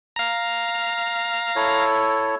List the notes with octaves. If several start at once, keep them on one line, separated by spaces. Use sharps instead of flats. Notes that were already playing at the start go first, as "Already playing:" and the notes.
F5 A#5
E4 A4 C#5